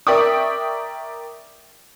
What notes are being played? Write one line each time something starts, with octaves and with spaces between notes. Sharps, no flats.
A#4 D5 E5 G5 C#6 D#6